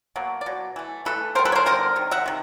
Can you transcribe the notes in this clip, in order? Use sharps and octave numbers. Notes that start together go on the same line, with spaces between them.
B2 F#3 A#3
D5
B2 F#3
E3 A3
E3 A3 A4 B4
D3 G3 B3 A#4 C5
A4 B4
C#5
A#4 C5
D3 G3 B3 A#4 C5
C3 D#3
E5 F#5
C3 D#3